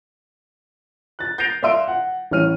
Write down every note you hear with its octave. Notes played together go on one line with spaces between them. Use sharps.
F#6 A6
G6 A6 A#6 C7 D7 F7
D5 E5 F5 C6 E6 D7
F#5
A1 C#5 F6 D#7